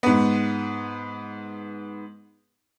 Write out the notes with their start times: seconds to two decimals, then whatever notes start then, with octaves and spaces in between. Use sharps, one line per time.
0.03 G#2 B3